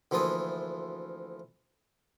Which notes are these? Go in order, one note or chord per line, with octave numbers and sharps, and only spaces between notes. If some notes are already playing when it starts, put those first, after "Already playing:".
D2 E3 F3 A#3 F4 D#6